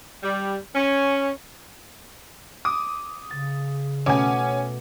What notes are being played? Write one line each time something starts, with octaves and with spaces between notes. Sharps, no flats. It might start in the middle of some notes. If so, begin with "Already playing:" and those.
G3
C#4
D6 D#6
C#3 A6
B2 A3 C#4 G#5 D6